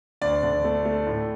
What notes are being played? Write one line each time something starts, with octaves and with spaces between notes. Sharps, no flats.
D2 D5
D3
A3
A3
A2